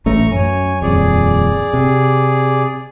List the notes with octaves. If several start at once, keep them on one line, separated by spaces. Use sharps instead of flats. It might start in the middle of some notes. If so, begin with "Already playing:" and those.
A1 A3 C#4 A#5 C#6
F#2 C#5 G#5
D#1 F2 G#4 D5
C3